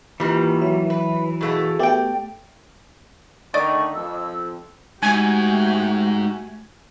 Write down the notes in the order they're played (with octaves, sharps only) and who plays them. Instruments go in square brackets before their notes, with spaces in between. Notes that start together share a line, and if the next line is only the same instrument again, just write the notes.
[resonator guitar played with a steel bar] G#2 D#3 G3 [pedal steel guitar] E3 [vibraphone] A#3 F4 G4
[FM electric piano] F#3 [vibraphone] E5
[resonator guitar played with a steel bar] B4
[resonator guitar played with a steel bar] B2 A3 A4 [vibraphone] F#4 G#4 F5
[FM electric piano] A3 B3 G4 [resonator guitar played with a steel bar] D5 G5
[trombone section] D3 D#3 A3 [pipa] D5 D#5 [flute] C#6
[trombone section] F2 [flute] E6
[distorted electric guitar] G#2 [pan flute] A3 [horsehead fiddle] F#4 G4 [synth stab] G#5